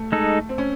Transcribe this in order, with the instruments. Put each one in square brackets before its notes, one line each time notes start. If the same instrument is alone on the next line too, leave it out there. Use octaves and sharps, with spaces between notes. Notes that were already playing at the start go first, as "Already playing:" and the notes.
Already playing: [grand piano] A3
[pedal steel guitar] G#3 D#4 A4
[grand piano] C4
C#4